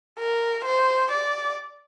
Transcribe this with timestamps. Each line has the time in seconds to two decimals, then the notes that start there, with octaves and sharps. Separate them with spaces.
0.19 A#4
0.65 C5
1.12 D5